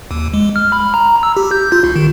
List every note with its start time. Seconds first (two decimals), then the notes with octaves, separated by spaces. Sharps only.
0.11 D#2
0.33 G#3
0.56 F6
0.72 B5
0.94 A#5
1.23 E6
1.37 G4
1.51 G6
1.72 F4
1.84 C2
1.96 D#3